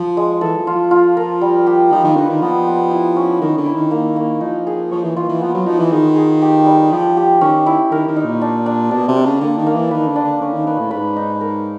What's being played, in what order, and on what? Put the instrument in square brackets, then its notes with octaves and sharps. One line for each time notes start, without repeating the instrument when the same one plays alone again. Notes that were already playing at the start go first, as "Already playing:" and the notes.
Already playing: [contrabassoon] F3
[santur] G#3
[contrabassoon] E3 [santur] A4
[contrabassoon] F3
[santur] F4
[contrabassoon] F3
[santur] F4
A#4
G3
G4
[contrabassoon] F3 [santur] D#4
[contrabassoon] D#3
[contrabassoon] D3 [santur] B4
[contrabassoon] D#3
[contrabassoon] F3 [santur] B3
[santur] B3
E4
C#4
[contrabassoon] D#3 [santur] A#4
[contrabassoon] D3
[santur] E4
[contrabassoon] D#3
[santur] A#3
A#3
[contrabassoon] F3 [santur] D#4
[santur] G#4
[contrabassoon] F3 [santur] C#5
[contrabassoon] E3
[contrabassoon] E3 [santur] F4
[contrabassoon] E3
[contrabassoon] F3 [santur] B3
[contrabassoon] F#3
[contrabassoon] F3 [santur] D#4
[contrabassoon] E3
[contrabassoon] D#3 [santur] G#4
[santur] G#4
G4
G3
[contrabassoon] F3 [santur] G4
[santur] G4
[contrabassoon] D#3 [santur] C#4
[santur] E4
[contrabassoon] D#3 [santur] A#4
[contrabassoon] D#3
[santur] D#4
[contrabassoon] A#2
[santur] D4
D4
[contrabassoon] B2 [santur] D4
[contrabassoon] C3
[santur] D4
[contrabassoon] C#3
[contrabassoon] D3 [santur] A#3
[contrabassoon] D#3
[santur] A#3
[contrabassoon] E3
[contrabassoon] D#3 [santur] B4
[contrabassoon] D3
[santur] D4
[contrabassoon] D3
[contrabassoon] D3 [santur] C#4
[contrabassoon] D#3
[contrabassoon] D#3 [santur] B4
[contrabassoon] A2
[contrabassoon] G#2 [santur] B4
[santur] D#4
A#4